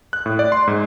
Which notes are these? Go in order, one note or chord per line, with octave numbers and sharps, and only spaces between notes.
F#6
A2
D5
C6
G#2